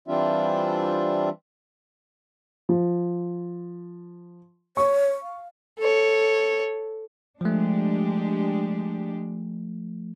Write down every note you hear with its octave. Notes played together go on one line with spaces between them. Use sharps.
E3 G3 C4 D4 F4 E5
F3
C#5 C#6
F5
A4 C#5
F3 G#3 A3 D4 G4